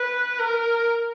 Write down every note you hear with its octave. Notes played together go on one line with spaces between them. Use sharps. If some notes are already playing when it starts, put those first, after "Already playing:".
Already playing: B4
A#4